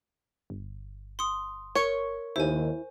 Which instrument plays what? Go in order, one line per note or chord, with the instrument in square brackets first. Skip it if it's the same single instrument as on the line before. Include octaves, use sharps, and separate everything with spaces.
[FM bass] G1
[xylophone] C6 D#6
[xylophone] A#4 C#6 C#7 [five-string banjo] C#5
[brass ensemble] D#2 [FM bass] E4 [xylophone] C5 G#5